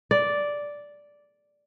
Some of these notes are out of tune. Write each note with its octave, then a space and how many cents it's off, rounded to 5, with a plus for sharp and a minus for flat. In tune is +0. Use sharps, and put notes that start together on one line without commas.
D5 -5